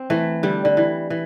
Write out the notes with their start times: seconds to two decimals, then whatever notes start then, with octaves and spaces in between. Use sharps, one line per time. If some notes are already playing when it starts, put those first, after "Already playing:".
Already playing: C4
0.10 E3 A3
0.43 D3 G3
0.65 D3
0.77 E3
1.10 E3